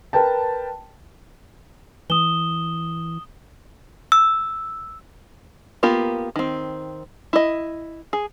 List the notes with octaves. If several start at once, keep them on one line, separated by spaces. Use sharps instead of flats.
A#4 B4 G5 A5
E3 D#6 E7 G7
E6
A#3 B3 F4 G4 A#4
D#3 C4
E4 D#5
G#4